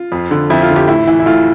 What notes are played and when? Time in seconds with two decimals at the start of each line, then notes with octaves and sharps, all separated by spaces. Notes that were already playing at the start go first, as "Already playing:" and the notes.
Already playing: F4
0.12 F2
0.31 D3
0.50 F2 E4
0.62 F4
0.70 D3
0.76 G4
0.88 A2 E4
1.07 E3
1.19 E4
1.26 A2 F4